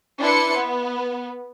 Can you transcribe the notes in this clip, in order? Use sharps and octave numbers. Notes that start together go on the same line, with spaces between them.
D4 E4 B4 C6 C#7
B3